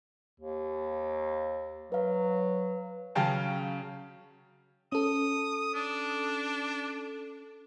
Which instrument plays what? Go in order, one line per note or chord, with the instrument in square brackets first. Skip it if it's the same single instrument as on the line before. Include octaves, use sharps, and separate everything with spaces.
[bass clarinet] D#2
[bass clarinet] F#3 [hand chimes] B4 F5
[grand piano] C#3 F#3 C#4 F5 G5 A5
[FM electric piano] C#4 A4 [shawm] D#6
[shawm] D4